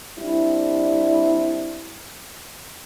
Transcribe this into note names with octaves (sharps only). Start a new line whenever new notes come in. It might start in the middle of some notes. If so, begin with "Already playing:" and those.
G3 C4 D4 E4